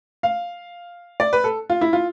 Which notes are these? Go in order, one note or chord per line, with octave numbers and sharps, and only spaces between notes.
F5
D5
B4
A4
F4
E4
F4